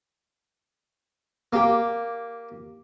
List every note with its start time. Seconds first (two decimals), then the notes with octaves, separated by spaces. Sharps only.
1.53 A#3 G4